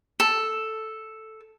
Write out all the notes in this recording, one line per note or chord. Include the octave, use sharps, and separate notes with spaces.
A4